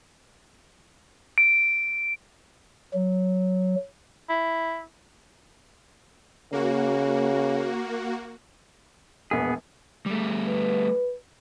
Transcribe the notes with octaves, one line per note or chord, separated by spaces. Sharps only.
D7
F#3
E4
C#3 A#3 F#4
E1 A#1 B3 G#4
G3 A3
B4